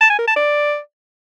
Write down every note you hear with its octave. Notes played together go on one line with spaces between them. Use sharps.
A5
G#5
A#4
A5
D5